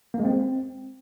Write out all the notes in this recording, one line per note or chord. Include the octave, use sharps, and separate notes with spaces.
A#3
G#3
C4